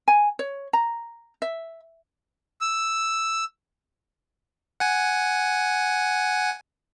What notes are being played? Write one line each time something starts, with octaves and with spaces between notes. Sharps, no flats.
G#5
C#5
A#5
E5
E6
F#5 G#5